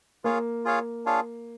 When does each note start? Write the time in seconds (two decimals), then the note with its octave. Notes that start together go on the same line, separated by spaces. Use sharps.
0.24 A#3 F4 G#4 C#5 F5
0.65 F4 G#4 C#5 F5
1.06 D4 F4 G#4 C#5 F5